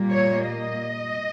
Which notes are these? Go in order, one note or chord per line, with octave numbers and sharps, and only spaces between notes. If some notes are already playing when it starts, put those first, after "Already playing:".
Already playing: A#2 G3 A#3
C#5
D#5